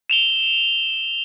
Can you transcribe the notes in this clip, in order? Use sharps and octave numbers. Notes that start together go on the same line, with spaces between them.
E7 F7 G7